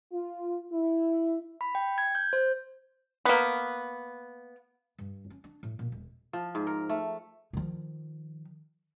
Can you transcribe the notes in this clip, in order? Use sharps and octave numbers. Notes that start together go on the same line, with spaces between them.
F4
E4
B5
G5
G#6
G6
C5
A#3 B3
G2
C#4
D4
A2
A#2
E1
F3
G#2
A#4
A3
D#3 F3